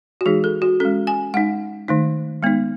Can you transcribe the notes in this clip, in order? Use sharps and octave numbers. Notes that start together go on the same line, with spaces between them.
F#4
E3 G#3 D#4 G#4
A4
F#4
G#3 C#4 A4
G#5
G#3 D#4 F#5
D#3 A3 D#4
G#3 B3 D#4